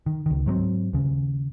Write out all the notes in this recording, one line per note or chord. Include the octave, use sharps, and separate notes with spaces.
D#3
C#2 D#3
G#2 F#3 G#3 C4
D#2 C#3